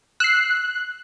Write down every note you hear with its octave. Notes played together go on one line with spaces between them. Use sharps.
E6 F#6 C7